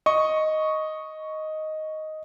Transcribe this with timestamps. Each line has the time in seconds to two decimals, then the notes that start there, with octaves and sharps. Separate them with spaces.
0.06 D#5 C#6